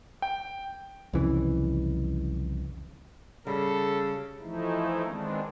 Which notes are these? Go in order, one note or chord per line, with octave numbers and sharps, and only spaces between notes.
G5
C2 F2 C#3 E3
C#3 G3 A4
E3 F3 A3 D#4 E4
D#3 G#3 B3 C4 D4